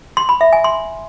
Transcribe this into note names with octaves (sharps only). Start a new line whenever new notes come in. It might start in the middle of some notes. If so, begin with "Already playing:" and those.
C6
B5
E5
G#5
C6